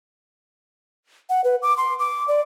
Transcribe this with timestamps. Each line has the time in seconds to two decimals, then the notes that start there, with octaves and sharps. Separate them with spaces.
1.30 F#5
1.44 B4
1.62 D6
1.77 C6
1.99 D6
2.28 D5